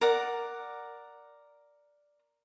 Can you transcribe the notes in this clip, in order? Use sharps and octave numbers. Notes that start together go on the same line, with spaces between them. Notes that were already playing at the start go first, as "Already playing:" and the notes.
A#4 D5 F#5